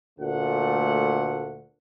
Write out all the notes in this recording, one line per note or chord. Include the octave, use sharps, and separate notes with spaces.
D2 A#2 A3 F#5